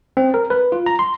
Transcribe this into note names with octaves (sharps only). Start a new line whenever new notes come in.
C4
A#4
B4
F4
A#5
C6